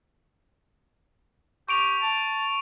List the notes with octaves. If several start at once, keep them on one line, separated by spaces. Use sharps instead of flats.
G4 C#6 D7 F7
A5